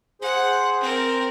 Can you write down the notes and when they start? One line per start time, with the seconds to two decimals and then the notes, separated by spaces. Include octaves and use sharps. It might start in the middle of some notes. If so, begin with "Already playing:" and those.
0.22 G#4 C5 F#5
0.81 C4 A#4